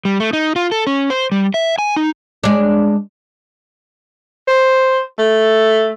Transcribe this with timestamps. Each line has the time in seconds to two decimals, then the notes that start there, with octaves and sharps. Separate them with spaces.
0.05 G3
0.20 A3
0.33 D#4
0.56 F4
0.72 A4
0.87 C#4
1.10 C5
1.32 G3
1.54 E5
1.78 G#5
1.96 D#4
2.44 G#3 D4
4.48 C5
5.19 A3